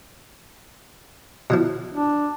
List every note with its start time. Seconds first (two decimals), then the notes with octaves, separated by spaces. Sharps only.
1.50 B2 E3 F3
1.93 D4